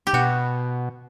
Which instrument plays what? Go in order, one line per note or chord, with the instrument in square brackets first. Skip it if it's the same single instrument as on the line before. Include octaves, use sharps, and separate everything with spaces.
[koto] G4
[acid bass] B2 [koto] F#4